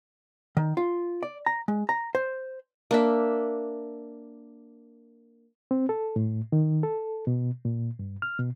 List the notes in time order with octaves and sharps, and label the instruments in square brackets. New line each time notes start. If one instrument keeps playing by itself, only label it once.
[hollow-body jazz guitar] D#3
F4
D5
A#5
G#3
A#5
C5
[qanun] A#3 D4 E5
[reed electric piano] C4
A4
A2
D#3
A4
B2
A#2
G2
F6
B2